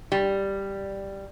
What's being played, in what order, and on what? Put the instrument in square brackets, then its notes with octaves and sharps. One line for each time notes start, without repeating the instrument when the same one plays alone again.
[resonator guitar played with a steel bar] G3